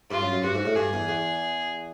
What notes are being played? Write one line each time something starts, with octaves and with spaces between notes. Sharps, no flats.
G2 F4
F#2
F#2
G2 F#4
G#2
A2
G2 G#4
E2
E2